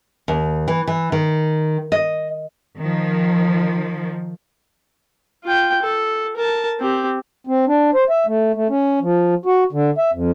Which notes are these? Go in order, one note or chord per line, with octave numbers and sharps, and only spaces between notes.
D#2
E3
E3
D#3
D#5
D#3 F3
F4 G5
A4
A#4 A5
C4 G4
C4
D4
C5
E5
A3
A3
C#4
F3
F#4
D3
E5
F2